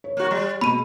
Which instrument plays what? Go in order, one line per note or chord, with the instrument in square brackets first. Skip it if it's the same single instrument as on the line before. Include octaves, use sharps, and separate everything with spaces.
[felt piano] C#5
[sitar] A#3 F#4
G3
[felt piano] B2 [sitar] G#3 [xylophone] B5 D#7